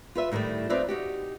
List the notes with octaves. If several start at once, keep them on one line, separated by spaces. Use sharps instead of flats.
F4 B4 E5
A2 D#3 F#3 G3 A3
C4 D#4 F4 B4 D5 E5
D#4 F#4 G4